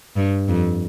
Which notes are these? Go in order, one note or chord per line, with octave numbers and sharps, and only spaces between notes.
G2
F2